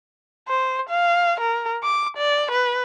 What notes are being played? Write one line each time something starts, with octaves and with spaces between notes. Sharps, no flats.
C5
F5
A#4
D6
D5
B4